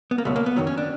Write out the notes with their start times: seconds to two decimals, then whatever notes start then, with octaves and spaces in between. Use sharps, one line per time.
0.11 B3
0.18 A#3
0.25 C#2 B2 F#3 A3
0.36 A#3
0.46 B3
0.56 F#2 D#3 F#3
0.67 C#4
0.77 D4